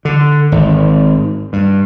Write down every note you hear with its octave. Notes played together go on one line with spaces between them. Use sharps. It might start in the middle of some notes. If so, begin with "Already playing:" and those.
D3
G#1
G2